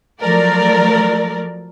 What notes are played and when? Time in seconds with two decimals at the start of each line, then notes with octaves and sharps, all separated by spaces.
0.21 F3 F#3 A3 A#4 D5